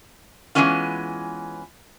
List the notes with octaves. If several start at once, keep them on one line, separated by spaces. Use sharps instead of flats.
E3 F#3 G#3 B3 C#4 F4